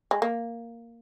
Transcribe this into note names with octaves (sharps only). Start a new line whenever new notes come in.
G#3
A#3